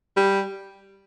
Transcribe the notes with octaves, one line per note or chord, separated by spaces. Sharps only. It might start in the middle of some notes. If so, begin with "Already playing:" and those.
G3